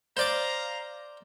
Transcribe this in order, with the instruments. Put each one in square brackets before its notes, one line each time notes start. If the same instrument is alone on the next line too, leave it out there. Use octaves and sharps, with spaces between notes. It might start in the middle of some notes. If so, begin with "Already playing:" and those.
[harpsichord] C5 D5 D6 [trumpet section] F5 A#5